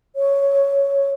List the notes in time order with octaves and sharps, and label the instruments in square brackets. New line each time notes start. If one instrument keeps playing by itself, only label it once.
[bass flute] C#5